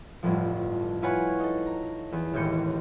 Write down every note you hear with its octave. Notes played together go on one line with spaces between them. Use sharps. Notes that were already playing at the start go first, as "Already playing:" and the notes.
G1 F2 A2 F3
E4 F4 B4 C#5 F#5 G#5
D#4 A4
A#5
E2
E1 A1 D#2 G6 C#7